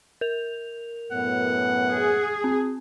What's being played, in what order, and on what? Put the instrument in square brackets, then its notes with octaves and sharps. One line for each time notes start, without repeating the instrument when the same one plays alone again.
[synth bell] A#4 F7
[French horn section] F#2 A2 B3 [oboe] F#5
[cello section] G#4
[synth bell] C4